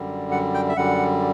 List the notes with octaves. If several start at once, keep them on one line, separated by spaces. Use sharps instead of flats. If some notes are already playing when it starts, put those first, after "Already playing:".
Already playing: F#2 D3 G3
F#5
G5
E5
F#2 D3 G3 F#5